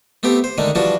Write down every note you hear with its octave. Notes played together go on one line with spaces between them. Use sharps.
A3 B3 C4 G4
C5
D3 D#3 G#3 A3
E3 F3 G3 D4 F#4